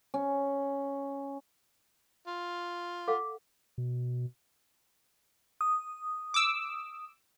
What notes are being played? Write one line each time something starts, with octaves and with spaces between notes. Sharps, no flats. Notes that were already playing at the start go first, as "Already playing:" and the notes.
C#4
F4
A4 F5 F#5 D6
B2
D#6
D6 E6